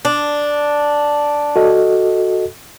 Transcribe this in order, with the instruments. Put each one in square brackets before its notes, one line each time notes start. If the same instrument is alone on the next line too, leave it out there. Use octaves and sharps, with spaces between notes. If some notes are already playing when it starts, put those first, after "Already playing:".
[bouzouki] D4
[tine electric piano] F#4 A4 D#5